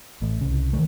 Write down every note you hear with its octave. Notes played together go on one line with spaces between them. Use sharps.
A1 A2
C2 C#3
D#3 E3 A3